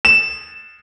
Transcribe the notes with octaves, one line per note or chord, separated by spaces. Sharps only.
E7